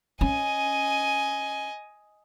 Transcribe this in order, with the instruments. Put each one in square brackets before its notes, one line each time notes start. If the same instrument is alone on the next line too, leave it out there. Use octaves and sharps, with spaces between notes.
[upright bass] C#4 [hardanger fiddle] D#5 G#5